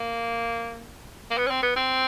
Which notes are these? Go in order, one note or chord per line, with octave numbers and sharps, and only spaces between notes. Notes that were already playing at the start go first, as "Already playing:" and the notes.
Already playing: A#3
A#3
B3
C#4
C4
B3
C4